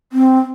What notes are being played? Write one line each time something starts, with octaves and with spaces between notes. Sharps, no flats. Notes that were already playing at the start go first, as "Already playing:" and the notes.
C4